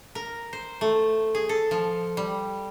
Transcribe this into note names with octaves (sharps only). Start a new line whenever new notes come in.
A#4
C5
A3
G#4
A4
F3
G3